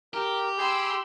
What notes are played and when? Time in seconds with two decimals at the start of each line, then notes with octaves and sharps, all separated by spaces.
0.14 G4 A#4
0.58 G#4 G5 B5 C6 E6